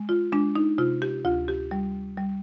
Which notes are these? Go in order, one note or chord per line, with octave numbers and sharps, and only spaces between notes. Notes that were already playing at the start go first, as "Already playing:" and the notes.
Already playing: G#3
F4
G#3 D4
D#4
C3 F4
G4
D2 F4
G4
G3
G3